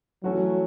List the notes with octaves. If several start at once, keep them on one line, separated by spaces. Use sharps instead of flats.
E3 F#3 A3 C#4 F#4